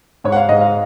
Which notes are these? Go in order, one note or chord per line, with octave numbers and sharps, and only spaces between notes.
G#2 C#5
F#5
F5
G#2 D#5
F5